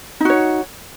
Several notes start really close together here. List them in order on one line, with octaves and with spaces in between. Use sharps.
D#4 F#4 C#5